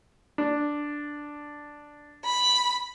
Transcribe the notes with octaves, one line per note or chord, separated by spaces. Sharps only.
D4
B5